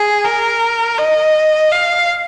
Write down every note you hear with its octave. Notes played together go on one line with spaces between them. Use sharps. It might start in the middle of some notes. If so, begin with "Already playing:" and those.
Already playing: G#4
A#4
D#5
F5